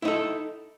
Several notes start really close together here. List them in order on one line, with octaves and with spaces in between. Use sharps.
E4 D#4 A4